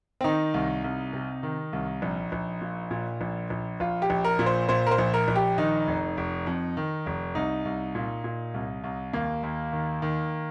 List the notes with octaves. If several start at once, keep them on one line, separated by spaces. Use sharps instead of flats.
C4
D#3 D#4
C2
C2
C3
D#3
C2
A#1
A#1
A#2
A#2
A#1
A#1
A#1 F4
G4
A#1
A#4
A#2
C5
A#2 C5
A#4
C5
A#1
A#4
A#1
G4
D#3 D#4
F1
F1
F2
D#3
F1
C2 D#4
C2
A#2
A#2
C2
C2
D#2 A#3
D#2
D#3
D#3